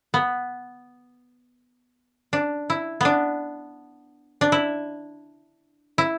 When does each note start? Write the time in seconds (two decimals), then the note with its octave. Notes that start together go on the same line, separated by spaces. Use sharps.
0.14 B3
2.33 D4
2.70 E4
3.01 B3 D4
4.41 D4
4.52 E4
5.98 E4